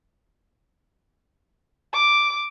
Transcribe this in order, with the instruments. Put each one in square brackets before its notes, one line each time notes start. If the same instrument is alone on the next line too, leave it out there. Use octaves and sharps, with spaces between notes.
[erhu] D6